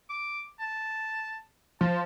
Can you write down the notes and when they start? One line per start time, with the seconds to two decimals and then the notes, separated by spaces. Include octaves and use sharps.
0.10 D6
0.59 A5
1.81 F3 A5